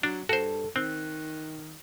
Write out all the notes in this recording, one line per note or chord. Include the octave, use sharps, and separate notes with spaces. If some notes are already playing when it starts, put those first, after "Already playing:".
F#3 D4
G2 F#4 A4 C5
D#3 C4 F#6